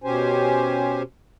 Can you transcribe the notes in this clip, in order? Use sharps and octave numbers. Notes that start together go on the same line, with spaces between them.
B2 C#4 G4 C5 G#5